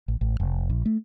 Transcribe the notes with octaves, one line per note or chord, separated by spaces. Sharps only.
A1
A1
F1
A#1
A3